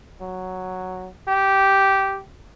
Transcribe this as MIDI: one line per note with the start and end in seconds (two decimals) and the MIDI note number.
0.21 1.08 54
1.28 2.20 67